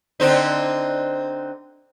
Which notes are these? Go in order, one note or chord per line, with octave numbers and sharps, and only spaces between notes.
D3 C4 D#4